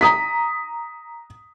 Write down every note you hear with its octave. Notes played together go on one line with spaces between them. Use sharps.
A#5 D#6 B6